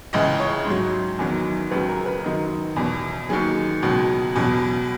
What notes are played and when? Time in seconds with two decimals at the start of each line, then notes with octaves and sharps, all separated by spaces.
0.13 C#2 C#3 E3 D#5
0.40 C#5
0.66 G#2 F#3
1.19 E2 D#3 F#3
1.71 C#2 C#3 F#3 B4
1.88 A#4
2.06 B4
2.24 F#2 D#3 F#3 D#5
2.76 E2 B2 F#3
3.29 D#2 D#3 F#3 G#4
3.82 C#2 B2 F#3
4.35 E2 B2 F#3